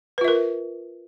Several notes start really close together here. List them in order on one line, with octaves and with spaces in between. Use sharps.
B4 F4 E5 A#4